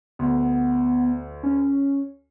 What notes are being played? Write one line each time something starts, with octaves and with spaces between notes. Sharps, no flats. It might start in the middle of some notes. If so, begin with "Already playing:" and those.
D2 B3
C#4